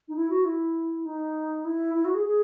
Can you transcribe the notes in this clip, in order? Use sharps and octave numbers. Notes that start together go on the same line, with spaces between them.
D#4
E4
F#4
E4
D#4
E4
E4
F#4
G#4
G#4